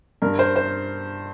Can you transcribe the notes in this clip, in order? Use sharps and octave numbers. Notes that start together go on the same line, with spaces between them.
G2 A#4
C5
C5